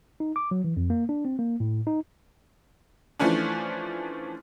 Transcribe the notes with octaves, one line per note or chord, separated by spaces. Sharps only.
D#4
D6
F#3
E3
F2
A#3
D4
C4
A#3
A2
D#4
E3 F3 A3 C#4 D4